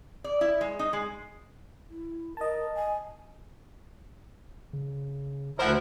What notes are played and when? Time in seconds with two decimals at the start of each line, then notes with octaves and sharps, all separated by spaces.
0.24 D5
0.41 E4
0.61 G#3
0.79 D#4
0.93 G#3
1.90 E4
2.37 A#4 D#5 A5
2.75 G#5
4.73 C#3
5.59 D2 F3 E4 A#4 C5 F#5